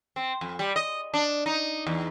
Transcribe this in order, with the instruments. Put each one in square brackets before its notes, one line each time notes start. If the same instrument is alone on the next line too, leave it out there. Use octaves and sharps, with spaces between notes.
[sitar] C4
F2
G3
D#5
D4
D#4
E2